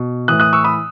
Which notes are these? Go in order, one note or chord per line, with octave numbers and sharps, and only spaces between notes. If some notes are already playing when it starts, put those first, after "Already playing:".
Already playing: B2
A2 E3 D#6 F#6
D#6 F#6
C#6 E6
B5 D#6